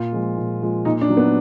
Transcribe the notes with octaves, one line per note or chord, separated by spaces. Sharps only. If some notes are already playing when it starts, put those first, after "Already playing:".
Already playing: A#2 F4
F3 G#3
A#2
F3 G#3
A#2 D#4
D4
F#3
B3